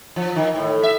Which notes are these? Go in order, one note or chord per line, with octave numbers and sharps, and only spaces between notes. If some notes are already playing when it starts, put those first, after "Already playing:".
F3
D#3
A2
E5